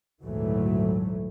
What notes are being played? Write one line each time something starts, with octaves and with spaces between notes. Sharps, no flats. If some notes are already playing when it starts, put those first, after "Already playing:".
G#1 D2 A#2 E3 F#3 A3